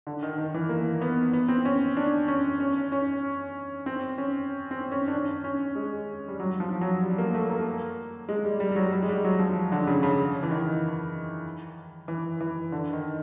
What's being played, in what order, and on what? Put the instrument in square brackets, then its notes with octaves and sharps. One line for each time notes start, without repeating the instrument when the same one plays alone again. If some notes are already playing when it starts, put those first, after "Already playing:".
[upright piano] D3
D#3
D#3
E3
A#3
B3
B3
C4
C#4
D4
C#4
C#4
C#4
C4
C#4
C4
C#4
D4
C#4
C#4
G#3
G3
F#3
F3
F#3
G3
A#3
A3
A#3
G#3
G3
G3
G3
F#3
G3
G#3
G3
F#3
F3
D3
C#3
C#3
E3
D#3
E3
E3
D3
D#3